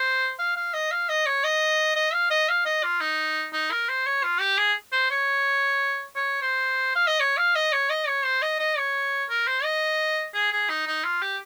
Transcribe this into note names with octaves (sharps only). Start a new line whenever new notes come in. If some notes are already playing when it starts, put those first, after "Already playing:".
Already playing: C5
F5
F5
D#5
F5
D#5
C#5
D#5
D#5
F5
D#5
F5
D#5
F4
D#4
D#4
A#4
C5
C#5
F4
G4
G#4
C5
C#5
C#5
C5
F5
D#5
C#5
F5
D#5
C#5
D#5
C#5
C5
D#5
D#5
C#5
A#4
C5
D#5
G#4
G#4
D#4
D#4
F4
G4